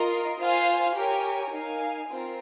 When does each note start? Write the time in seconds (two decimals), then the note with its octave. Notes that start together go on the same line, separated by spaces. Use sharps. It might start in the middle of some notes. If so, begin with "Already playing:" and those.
Already playing: F4 A#4 D#5
0.39 F4 C5 F5 G#5
0.96 G4 A#4 C#5 G#5
1.53 D#4 A#4 F5 G#5
2.10 C4 F4 A#4